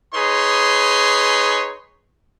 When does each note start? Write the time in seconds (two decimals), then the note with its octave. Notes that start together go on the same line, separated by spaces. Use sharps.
0.14 D#4 G#4 B4 C#5 C6